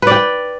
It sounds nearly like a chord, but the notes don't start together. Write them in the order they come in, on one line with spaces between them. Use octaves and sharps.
B4 D5 G5